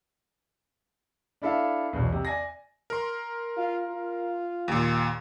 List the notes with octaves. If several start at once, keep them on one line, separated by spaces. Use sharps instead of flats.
D4 E4 A4 E5 F5
B1 E2
C3
D5 G#5 A#6
A#4 C6
F4
F4
D#2 A#2